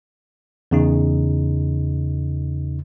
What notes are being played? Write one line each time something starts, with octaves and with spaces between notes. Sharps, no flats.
E2 C#3 D#4